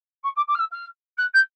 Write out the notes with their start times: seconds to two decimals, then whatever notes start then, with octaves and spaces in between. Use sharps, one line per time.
0.23 C#6
0.36 D6
0.47 D6
0.54 F6
0.59 E6
0.71 F6
1.17 F#6
1.34 G6